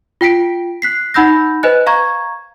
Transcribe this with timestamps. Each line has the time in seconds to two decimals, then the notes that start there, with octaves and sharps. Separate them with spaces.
0.21 F4 G5 B6 D7
0.82 F#6 B6 C7
1.14 D#4 F#5 B5 E6 G6 A#6
1.63 B4 C5 D#5 G#5 F#6
1.87 F5 A#5 C#6 G#6